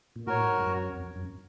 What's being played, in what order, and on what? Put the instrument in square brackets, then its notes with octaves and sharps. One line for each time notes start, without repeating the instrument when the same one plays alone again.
[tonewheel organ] A#2
[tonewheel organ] A2 [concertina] F#4 A#4 C#5
[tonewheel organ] G#2
F#2
F2
F#2